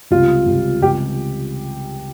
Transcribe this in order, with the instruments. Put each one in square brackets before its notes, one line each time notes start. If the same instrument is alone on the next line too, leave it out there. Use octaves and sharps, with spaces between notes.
[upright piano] C#2 C3 G3 [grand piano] F4
[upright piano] C#2 C3 G3
[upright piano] C#2 C3 G3 [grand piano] G4